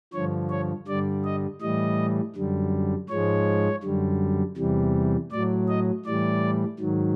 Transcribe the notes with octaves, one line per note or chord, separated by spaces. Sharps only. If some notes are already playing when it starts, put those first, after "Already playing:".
G2 D3 F3 C#5
C#5
G2 D3 G3 D5
D#5
A2 E3 G3 D#5
F#2 D3 G3
G#2 F3 G#3 C#5
F#2 D3 G3
E2 C3 E3 G3
A2 F#3 D5
D#5
A2 E3 G3 D5
G#2 D#3 F#3